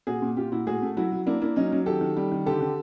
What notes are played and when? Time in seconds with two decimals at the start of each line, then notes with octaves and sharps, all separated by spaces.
0.07 A#2 F#4 G#4
0.22 A#2
0.37 A#2 F4 G4
0.52 A#2 E4 F#4
0.67 A2 F#4 G#4
0.82 A3
0.97 F#3 E4 F#4
1.12 F#3
1.27 A#3 D4 E4
1.41 A#3 D4 E4
1.56 F#3 C#4 D#4
1.72 F#3
1.86 D#3 G4 A4
2.01 D#3
2.17 G3
2.32 D#3
2.46 D3 G4 A4
2.61 D3